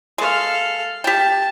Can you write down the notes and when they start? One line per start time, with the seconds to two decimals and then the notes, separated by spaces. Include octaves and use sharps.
0.18 G#3 A4 F5
1.04 G4 G5 A5